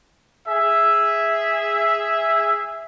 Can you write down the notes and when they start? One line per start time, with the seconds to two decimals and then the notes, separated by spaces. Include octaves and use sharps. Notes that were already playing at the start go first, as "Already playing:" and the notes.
0.47 G#4 E5